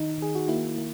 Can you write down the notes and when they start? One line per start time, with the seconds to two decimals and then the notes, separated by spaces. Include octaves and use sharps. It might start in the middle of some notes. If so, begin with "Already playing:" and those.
Already playing: D#3 D#4
0.18 D#3 G#4
0.35 F#4
0.48 A#3 E4
0.78 A#3